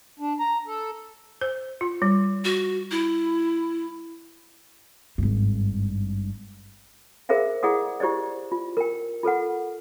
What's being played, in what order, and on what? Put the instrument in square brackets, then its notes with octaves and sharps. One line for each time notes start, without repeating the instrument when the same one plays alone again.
[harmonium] D4
A#5
A4
[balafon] C5
F4
G3
[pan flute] F#4
E4
[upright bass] G#1 G2
[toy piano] G#4 A#4 C5 E5 F5
E4 G#4 D5 F#5 D#6
E4 G4 C5 D5 D#5
F4
A#4 G5
F4 A4 B4 F#5